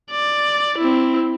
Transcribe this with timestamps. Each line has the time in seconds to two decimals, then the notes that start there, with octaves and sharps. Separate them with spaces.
0.10 D5
0.78 C4 E4